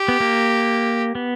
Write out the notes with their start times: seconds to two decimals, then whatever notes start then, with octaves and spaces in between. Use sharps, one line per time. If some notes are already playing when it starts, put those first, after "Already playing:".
Already playing: G4
0.08 B3
0.20 A#3
1.15 B3